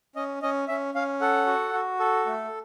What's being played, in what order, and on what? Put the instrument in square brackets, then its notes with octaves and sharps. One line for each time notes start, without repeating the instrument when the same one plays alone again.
[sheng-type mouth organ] C#4 D#5
C#4 D#5
C#4 E5
C#4 F5
A4 F#5
F#4
F#4
A4
A3